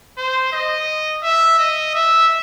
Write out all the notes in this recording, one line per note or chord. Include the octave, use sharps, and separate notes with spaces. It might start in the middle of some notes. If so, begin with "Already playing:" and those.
C5
D#5
E5
D#5
E5